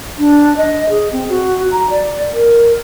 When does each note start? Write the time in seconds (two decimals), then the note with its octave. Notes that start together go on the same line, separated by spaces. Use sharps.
0.19 D4
0.57 D#5
0.90 G#4
1.12 C4
1.29 F#4
1.72 A#5
1.90 D5
2.33 A#4